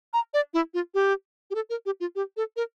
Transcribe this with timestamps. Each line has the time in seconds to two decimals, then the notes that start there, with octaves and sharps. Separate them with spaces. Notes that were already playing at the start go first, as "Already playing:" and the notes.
0.14 A#5
0.34 D5
0.54 E4
0.74 F4
0.94 G4
1.51 G4
1.55 A4
1.70 A#4
1.86 G4
2.00 F4
2.15 G4
2.37 A4
2.56 A#4